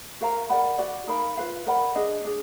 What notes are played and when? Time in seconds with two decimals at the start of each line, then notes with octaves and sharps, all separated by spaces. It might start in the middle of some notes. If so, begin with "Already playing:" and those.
0.21 F#4 A#4 F5 A#5
0.49 A#4 D5 F#5 B5
0.78 F#4 D5 F#5
1.07 D#4 A#4 F5 B5
1.37 F4 B4 F5
1.67 A#4 D5 F#5 B5
1.95 D4 G#4 D#5
2.25 D4 G#4